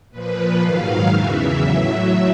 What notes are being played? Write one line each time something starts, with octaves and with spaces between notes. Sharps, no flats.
A#2 F3 B4
G#2 D#3 F#3 F5
E2 C#3 E3 E5
A2 F#3